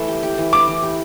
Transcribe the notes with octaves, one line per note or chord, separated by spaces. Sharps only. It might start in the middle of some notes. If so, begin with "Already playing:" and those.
Already playing: E3 A3
G4
G4
E3
B3 D6
E3
G4